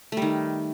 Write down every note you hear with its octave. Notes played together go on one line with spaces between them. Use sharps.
D#3 G3 A3